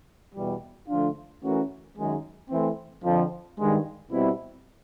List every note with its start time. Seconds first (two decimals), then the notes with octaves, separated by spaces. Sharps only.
0.35 E2 B2 G3
0.89 D3 F3 A3 D4 F4
1.43 E3 A3 C#4 F#4 A#4
1.97 F#2 D#3 G#3
2.50 E3 A3 C4
3.05 F2 D3 F3
3.58 G2 D#3 G#3
4.12 B2 G3 C4 E4